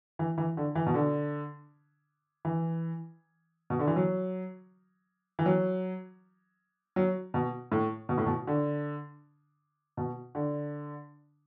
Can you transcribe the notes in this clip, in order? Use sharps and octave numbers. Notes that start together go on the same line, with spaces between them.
E3
E3
D3
E3
B2
D3
E3
B2
D3
E3
F#3
E3
F#3
F#3
B2
A2
B2
A2
B2
D3
B2
D3